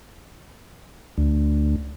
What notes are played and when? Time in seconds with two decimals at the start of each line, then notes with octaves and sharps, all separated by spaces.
1.18 D2